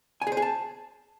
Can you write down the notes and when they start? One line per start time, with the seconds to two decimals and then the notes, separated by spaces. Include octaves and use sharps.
0.22 G#5
0.27 G#4
0.32 C5
0.37 G#4
0.42 A5